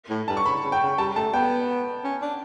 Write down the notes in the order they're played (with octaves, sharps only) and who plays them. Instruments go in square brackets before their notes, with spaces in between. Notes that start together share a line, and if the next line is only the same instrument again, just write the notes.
[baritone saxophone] A2
[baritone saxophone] G2 [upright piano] A5
[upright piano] C#6
[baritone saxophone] C#3 [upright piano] B5
[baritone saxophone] C#3
[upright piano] G5
[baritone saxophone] C#3
[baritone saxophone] G3 [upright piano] A5
[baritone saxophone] A3 [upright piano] A5
[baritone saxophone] B3 [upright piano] G5
[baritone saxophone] C#4
D4